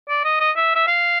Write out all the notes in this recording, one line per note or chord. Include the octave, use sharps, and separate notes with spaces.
D5
D#5
D#5
E5
E5
F5